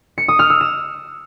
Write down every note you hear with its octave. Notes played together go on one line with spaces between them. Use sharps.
C#7
D#6
F6
E6
E7